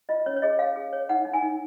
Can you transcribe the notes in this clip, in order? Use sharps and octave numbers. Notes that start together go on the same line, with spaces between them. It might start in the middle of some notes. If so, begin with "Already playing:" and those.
F4 D#5
C#4 C#5
C#5
G#4 D#5
C#5 F5
G#4
C#5
D#4 F#5
D#4
G#5
D#4